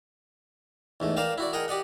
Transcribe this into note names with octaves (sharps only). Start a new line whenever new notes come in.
E2 G#2 A3
A#4 C5 D5 F5 G5 A5
E4 F#4 D5
G#4 A#4 D#5 F#5 G5
G4 D5 D#5 F#5